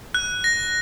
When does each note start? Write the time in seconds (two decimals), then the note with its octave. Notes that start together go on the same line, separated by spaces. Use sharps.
0.14 F#6
0.44 A#6